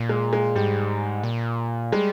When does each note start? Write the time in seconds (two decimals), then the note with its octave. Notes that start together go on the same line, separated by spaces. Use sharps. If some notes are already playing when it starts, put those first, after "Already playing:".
Already playing: A#2
0.09 G#3
0.33 G#3
0.55 G#2 G3
1.24 A#2
1.92 G3 G#3